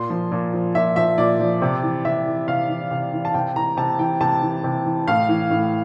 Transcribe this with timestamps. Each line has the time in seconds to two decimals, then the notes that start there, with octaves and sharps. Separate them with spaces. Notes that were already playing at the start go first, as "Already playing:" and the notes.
Already playing: A#2 C6
0.10 F3
0.32 A#2
0.53 F3
0.75 A#2 E5
0.96 F3 E5
1.18 A#2 D5
1.40 F3
1.62 C3
1.83 E3
2.05 C3 E5
2.27 E3
2.48 C3 F5
2.69 E3
2.91 C3
3.13 E3
3.25 A5
3.34 C3 G5
3.56 E3 A#5
3.77 C3 A5
3.99 E3 G5
4.21 C3 A5
4.42 E3
4.64 C3
4.85 E3
5.07 A2 F5
5.29 E3
5.50 A2